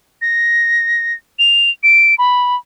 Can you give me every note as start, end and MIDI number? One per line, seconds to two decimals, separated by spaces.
0.22 1.13 94
1.39 1.70 101
1.83 2.15 98
2.18 2.56 83